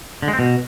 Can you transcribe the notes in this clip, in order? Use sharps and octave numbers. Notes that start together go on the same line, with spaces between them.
D3
G#3
C4
B2